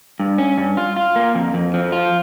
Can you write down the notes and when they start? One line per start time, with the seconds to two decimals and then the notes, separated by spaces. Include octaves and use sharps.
0.20 G2
0.38 C#4
0.58 G2
0.77 F4
0.97 F4
1.16 A#3
1.35 F2
1.54 F2
1.74 F3
1.92 F4